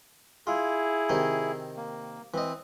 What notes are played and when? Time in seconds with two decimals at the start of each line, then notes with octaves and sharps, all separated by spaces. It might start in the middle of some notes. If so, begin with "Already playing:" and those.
0.47 E4 F4 G#4
1.09 C3 D#3 D#4
1.77 A#3
2.34 E3 C4 D#5